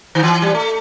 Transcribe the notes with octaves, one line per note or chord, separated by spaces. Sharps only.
D#3
E3
G3
A3